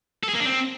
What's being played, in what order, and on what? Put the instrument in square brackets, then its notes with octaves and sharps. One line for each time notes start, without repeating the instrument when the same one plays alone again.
[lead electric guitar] A4
G#4
A#3
D4
C4